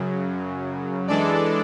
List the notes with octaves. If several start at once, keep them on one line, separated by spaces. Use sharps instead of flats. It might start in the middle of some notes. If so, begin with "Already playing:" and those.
Already playing: F#2 C#3 F#3
E3 G#3 D4 A4 D5